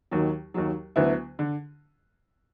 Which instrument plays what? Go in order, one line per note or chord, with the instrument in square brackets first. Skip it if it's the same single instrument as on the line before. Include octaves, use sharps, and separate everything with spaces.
[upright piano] D#2 D#3 F#3
D#2 D#3 F#3
D2 D3 F#3 B3 E4
D3